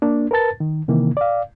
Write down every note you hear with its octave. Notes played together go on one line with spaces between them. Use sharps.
A#3 D4
A#4 B4 A5 A6
D#3
C3 D#3 E3 A#3
D5 F5